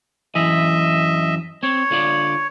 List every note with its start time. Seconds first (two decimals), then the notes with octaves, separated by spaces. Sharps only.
0.35 F#2 E3 D#5 E5 G#5
1.63 C4 C#5
1.91 D3 F4 D5